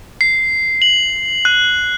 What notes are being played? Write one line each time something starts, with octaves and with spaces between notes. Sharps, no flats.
C7
F#7
F#6